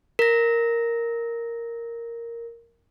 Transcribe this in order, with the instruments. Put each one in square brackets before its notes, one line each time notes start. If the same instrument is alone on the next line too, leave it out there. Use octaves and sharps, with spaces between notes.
[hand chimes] A#4 A#6